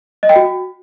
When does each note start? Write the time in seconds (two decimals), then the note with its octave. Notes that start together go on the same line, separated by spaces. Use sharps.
0.23 D#5
0.29 G5
0.36 F#4